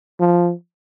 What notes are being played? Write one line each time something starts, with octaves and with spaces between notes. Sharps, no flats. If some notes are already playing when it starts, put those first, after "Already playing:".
F3